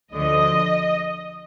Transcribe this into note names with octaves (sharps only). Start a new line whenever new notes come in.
D2 D3 F3 D#5